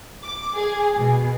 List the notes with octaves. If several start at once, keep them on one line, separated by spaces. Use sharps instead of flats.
D6
G#4
B2